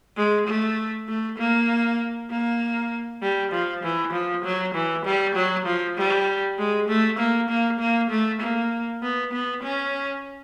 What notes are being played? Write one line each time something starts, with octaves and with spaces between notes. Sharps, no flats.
G#3
A3
A3
A#3
A#3
G3
F3
E3
F3
F#3
E3
G3
F#3
F3
G3
G#3
A3
A#3
A#3
A#3
A3
A#3
B3
B3
C#4